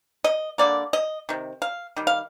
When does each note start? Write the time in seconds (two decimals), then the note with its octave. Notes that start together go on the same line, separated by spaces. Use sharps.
0.24 D#5
0.58 D3 G3 A#3 D5
0.93 D#5
1.29 C3 D#3
1.62 F5
1.97 D#3 G3
2.07 F5